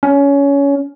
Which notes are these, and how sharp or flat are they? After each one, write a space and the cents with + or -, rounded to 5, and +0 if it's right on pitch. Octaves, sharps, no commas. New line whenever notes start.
C#4 +20